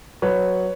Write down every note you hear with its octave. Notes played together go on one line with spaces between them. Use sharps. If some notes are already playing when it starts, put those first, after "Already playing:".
F#3 B4 C#5